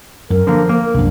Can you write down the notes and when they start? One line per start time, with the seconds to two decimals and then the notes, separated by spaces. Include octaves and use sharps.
0.30 F#2 A#4
0.47 D3 F3 A#3
0.69 A#3
0.94 C2 F#2 D4